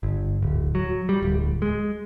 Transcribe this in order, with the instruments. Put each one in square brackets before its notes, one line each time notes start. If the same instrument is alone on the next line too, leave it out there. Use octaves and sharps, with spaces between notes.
[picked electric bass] G1
D1
F#3
G3
D1
G#3